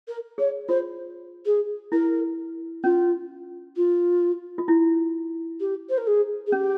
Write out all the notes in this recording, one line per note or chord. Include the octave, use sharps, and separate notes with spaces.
A#4
G#4 C#5
F4 C5
G#4
E4 A#4
C#4 F4
F4
F4
E4
G4
C5
A#4
G#4
G#4
C#4 G4